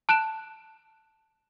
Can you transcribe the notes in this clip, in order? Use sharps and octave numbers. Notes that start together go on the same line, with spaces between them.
A5 F#6 D7 E7